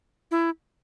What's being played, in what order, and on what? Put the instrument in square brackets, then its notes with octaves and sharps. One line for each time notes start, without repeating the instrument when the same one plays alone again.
[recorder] E4